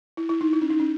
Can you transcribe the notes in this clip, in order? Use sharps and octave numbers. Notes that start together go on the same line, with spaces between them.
E4
E4
D#4
E4
C#4
D#4
C#4